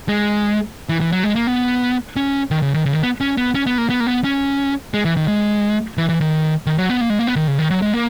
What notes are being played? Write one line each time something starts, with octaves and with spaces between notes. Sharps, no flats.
G#3
E3
E3
F#3
G#3
A#3
B3
C#4
D#3
C#3
D#3
C#3
D#3
B3
C#4
B3
C#4
B3
A#3
B3
A#3
B3
C#4
G#3
E3
D#3
G#3
E3
E3
D#3
D#3
F#3
B3
A#3
G#3
A#3
B3
D#3
C#3
D#3
F#3
G#3
A#3